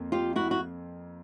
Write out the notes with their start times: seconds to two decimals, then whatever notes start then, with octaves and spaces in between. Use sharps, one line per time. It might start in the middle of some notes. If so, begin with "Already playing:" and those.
Already playing: F2 A#3
0.12 F4 G4
0.36 E4 F#4
0.51 F#4